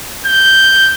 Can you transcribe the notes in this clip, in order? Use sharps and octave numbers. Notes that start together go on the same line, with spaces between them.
G6